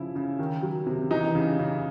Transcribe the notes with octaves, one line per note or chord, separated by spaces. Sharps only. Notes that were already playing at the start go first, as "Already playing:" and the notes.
Already playing: C#3 F3 E4
C#3
D#3
F#3
C3
E3 D#4
C#3
C#3